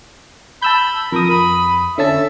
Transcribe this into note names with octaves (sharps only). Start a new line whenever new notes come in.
A5 B5 E6 G6
F2 A#4 D#6
B5
D3 C#4 E5 A5